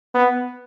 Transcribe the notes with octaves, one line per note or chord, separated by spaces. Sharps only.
B3